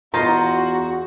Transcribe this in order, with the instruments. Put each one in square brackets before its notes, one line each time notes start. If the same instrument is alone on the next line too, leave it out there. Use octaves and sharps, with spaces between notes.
[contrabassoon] E2 [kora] F4 C5 D#5 [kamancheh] F#4 [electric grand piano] A#5